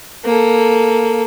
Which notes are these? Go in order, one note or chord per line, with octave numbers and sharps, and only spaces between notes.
A#3 A4